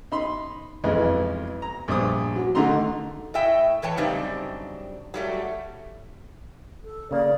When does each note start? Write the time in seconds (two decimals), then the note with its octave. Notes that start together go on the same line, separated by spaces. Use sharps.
0.12 D#4 B5 C6
0.84 B1 F2 E3 G#3 E4 B4
1.62 A#5
1.88 A#1 G2 C5 D6 D#6
2.36 F#3
2.55 D3 D#3 A3 D#4 A#5 C6
3.34 A2 D#5 E5 G5
3.82 A2 E3 B4 C#5 G5 A5
3.97 F#2 C#3 G3 C4 D4 D#4
5.14 F#3 G3 A3
6.84 A4
7.11 C#3 A#3 D5